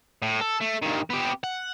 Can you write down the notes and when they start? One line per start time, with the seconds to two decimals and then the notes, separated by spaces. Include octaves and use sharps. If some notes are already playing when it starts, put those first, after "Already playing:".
0.22 A2
0.41 A4
0.61 A3
0.82 G2 D#3
1.10 B3 G4
1.44 F#5